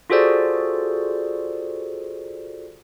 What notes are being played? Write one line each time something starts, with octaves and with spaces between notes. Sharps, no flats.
F4 F#4 G#4 A4 C5 D5